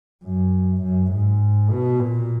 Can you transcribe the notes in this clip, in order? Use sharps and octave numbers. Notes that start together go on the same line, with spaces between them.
F#2
F#2
G#2
B2
A#2